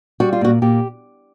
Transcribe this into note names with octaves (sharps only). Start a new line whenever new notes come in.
G3 F#4
F4
A#2 F#4
A#2 G4